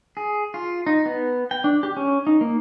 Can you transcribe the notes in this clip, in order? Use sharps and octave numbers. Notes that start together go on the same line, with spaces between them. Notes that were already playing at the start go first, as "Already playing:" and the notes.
G#4
F4
D#4
B3
G5
D4
G4
C#4
D#4
A#3